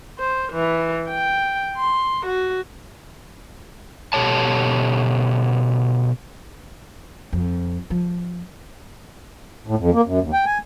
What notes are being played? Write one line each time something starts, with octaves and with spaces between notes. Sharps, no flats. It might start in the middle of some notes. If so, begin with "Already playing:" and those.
C5
E3
G5
C6
F#4
B2 G4 A4 C#5 A5
F2
F3
A2
F2
A#3
F#2
D#2
G5
G#5